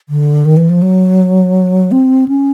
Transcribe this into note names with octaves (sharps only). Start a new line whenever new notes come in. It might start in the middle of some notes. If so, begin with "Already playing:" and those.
D3
D#3
E3
F3
F#3
C4
C#4